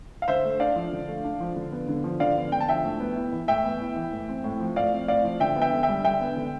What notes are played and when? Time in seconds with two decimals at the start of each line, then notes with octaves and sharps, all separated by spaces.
0.22 F5
0.28 D3 C5 E5
0.45 A3
0.60 D4 D5 F5
0.76 F3
0.92 D3
1.08 A3
1.24 D4
1.40 F3
1.56 D3
1.72 B3
1.88 D3
2.04 F3
2.20 D3 D5 F5
2.36 B3
2.52 D3 G5
2.60 A5
2.68 F3 E5 G5
2.85 A2
3.00 B3
3.16 E4
3.32 E3
3.48 A2 E5 G5
3.64 B3
3.80 E4
3.96 E3
4.12 A2
4.29 C4
4.44 A2
4.60 F3
4.76 A2 D5 F5
4.93 C4
5.08 A2 D5 F5
5.24 F3
5.40 D3 E5 G5
5.56 B3
5.61 E5 G5
5.73 D3
5.83 E5 G5
5.88 G3
6.04 D3 E5 G5
6.20 B3
6.36 D3